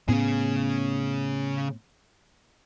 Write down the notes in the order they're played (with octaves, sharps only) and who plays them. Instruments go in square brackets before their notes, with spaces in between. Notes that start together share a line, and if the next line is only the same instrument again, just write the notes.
[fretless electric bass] A2 B3 C#4 [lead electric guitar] C#3 G#4